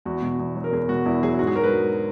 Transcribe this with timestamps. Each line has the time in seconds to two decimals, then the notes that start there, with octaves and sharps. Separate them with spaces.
0.05 E2 F#4
0.22 B2
0.39 E2
0.56 F#3
0.64 A#4
0.72 E2 G#4
0.89 B2 F#4
1.05 E2 E4
1.22 F#3 G#4
1.39 G#2 F#4
1.47 G#4
1.56 F#3 A#4
1.63 B4
1.72 F#3